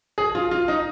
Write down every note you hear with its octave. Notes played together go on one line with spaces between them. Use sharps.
G#4
F4
F4
D#4